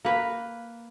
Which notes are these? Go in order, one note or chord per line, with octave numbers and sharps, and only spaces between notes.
A#3 B4